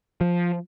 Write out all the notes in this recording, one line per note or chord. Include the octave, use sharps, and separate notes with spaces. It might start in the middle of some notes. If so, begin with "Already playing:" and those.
F3